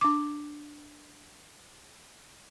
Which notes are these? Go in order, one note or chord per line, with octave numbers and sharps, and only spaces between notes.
D4 D6